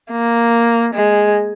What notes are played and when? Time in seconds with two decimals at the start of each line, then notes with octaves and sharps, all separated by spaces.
0.11 A#3
0.94 G#3